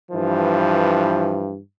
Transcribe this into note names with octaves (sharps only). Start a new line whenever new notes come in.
G2 E3 F3